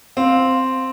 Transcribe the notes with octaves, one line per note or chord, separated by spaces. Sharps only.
C4 F5